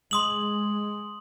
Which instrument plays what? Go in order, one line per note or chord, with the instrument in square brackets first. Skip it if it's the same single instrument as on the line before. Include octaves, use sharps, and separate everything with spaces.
[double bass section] G#3 [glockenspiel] C6 D#6 F#7